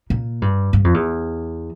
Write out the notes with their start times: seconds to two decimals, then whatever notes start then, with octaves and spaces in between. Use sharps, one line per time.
0.10 A#2
0.42 G2
0.73 G2
0.84 F2
0.94 E2